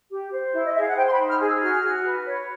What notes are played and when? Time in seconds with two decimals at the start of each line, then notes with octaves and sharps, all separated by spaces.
0.11 G4
0.32 C5
0.53 E4
0.65 D#5
0.73 G#4 E5
0.81 F5
0.88 F#5
0.96 C5 G5
1.07 C6
1.12 B5
1.18 D#4
1.28 F6
1.39 G#4
1.45 E6
1.61 F#4 F6
1.83 F#4
2.04 B4
2.26 C#5